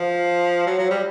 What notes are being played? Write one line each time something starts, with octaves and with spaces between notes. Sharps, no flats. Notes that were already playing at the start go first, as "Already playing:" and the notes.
Already playing: F3
F#3
F#3
G3